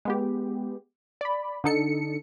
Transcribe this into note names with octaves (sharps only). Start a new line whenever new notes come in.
G#3 B3 G4
D5 B5
D3 D4 D#4 A4 C#7